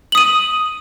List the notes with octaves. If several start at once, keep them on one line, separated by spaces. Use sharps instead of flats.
D#6 D#7 F#7